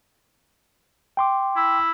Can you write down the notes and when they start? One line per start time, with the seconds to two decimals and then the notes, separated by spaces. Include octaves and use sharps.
1.17 G5 C6 D6
1.56 E4